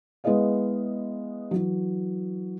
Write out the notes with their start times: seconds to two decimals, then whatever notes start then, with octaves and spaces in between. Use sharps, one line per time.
0.24 G#3 B3 E4 G#4 D#5 F5
1.51 E3 F#3